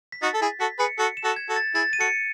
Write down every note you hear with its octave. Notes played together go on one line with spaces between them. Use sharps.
B6
D#4 F#4 A6
A4
E4 G#4 B6
F#4 A4 B6
G#4 B4 C#7
F#4 A4 C#7
E7
F#4 A4
G#6
F#4 A4
A6
E4 G#4 A6
D#7
F#4 A4 C#7